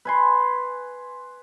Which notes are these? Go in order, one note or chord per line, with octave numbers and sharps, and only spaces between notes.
B4 G#5 C6